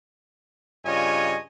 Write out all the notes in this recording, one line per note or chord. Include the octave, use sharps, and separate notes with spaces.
G2 C#3 F4 C#5 D#5 G#5